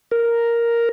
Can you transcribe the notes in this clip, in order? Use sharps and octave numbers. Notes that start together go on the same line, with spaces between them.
A#4